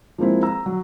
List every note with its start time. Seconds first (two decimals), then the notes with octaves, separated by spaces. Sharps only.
0.18 F3 G#3 A#3 C4 E4
0.43 A#5 E6
0.66 F#3